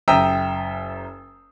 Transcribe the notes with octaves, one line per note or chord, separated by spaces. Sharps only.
F#1 E5 G5 A#5 D#6 E6